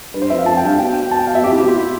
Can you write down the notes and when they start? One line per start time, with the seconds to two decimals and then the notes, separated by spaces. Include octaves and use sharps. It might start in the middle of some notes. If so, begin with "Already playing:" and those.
0.14 G2 B4
0.22 C5
0.30 F2 E5
0.39 F5
0.46 F2 A5
0.57 G5
0.63 G2 F5
0.79 B2 G5
1.11 A5
1.19 G5
1.27 F5
1.35 B2 E5
1.44 C3 G4
1.52 E4
1.60 B2 G4
1.68 F4
1.76 E4